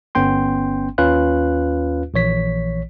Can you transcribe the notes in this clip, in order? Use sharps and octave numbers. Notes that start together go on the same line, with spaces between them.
G1 B3 C#4 G5 C6
D#2 C#4 F4 B4 F5 F#6
A#1 E3 C#5 B6